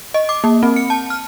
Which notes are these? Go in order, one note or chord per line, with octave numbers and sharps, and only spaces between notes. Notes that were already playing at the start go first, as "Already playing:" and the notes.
D#5
D6
A#3
C4
C#7
A5
F6